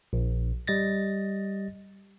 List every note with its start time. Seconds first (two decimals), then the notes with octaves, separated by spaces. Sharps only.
0.13 A#1
0.67 G3 D#5 A6 A#6